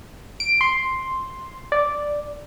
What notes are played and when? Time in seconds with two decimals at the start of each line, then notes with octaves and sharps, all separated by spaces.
0.40 D7
0.61 C6
1.72 D5